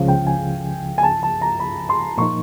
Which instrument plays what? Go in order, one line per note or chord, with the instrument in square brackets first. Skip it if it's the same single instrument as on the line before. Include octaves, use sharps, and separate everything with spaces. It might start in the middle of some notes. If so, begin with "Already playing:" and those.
Already playing: [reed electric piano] C#2 C#3 F3 [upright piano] F5
[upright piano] G5
G#5
G#5
A5
A5
A#5
B5
C6
[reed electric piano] A#2 F3 A#3 D#4 [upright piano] C#6